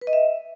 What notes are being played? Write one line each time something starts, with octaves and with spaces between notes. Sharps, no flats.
B4
D#5
E5